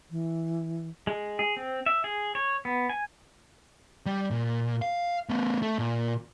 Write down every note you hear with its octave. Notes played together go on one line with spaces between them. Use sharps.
E3
G#3
G#4
C4
E5
G#4
C#5
B3
G#5
G3
A#2
F5
A3 B3
A3
A#2